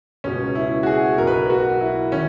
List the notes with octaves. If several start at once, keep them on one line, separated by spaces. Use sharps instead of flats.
C#2 B2 C#4
E4
F#4
G#4
B1 B2 A#4
B4
A#4
F#4
E4
D#3 C#4